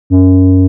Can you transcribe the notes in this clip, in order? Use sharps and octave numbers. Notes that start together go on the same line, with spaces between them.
F#2